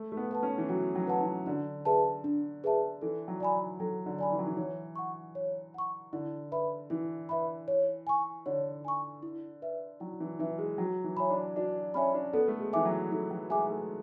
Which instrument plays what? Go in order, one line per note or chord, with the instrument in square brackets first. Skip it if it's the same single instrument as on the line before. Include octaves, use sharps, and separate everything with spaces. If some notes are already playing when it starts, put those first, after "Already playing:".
Already playing: [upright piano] A3
A3
B3
[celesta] B4 F#5 A5
[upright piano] C#4
E3
[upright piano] F#3 [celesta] F#4
[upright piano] F#3
[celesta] B4 F#5 A5
[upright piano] E3
[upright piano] D3 [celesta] D4
[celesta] G#4 B4 E5 A5
D4
G#4 B4 E5 A5
[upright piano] E3 [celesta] A4
[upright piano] F#3
[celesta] D5 G#5 B5
[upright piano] F#3 [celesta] A4
[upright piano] D3
[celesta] D5 G#5 B5
[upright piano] E3
F#3
E3
[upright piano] E3 [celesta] C#5
[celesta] F#5 C#6
C#5
F#5 C#6
[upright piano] D3 [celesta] E4
[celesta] B4 E5 B5
[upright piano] E3 [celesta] E4
[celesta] B4 E5 B5
C#5
G#5 C#6
[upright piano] D3 [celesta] C#5
[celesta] G#5 C#6
E4
B4 E5
[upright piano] F#3 [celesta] E4
[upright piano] E3
[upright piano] E3 [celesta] B4 E5
[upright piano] G#3
[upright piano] F#3 [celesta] F#4
[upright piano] E3
[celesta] C#5 E5 G#5 B5
[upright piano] D4
[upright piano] D4 [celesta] F#4
[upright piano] C#4 [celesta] C#5 E5 G#5 B5
[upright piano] D4
[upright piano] B3 [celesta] A4
[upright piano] A3
G#3
[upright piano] E3 [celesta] E5 G#5 D6
[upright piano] F#3
[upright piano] E3 [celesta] A4
[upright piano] F#3
[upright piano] G#3 [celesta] E5 G#5 D6
[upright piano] A3